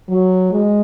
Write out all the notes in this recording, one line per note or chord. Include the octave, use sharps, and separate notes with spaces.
F#3
G#3